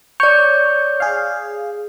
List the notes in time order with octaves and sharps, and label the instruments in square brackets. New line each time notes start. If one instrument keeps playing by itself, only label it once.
[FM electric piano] C#5 [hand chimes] D5 G6
[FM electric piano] G#4 F5